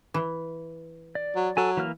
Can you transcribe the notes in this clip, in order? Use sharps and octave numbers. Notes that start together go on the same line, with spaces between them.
E3
D5
F#3
F#3 A4 G#5
E3 A#3 F6